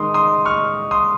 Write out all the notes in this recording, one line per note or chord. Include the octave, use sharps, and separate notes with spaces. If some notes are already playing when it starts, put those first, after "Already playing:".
Already playing: D#3 G#3 C6 D#6
C6 D#6
C#6 F6
C6 D#6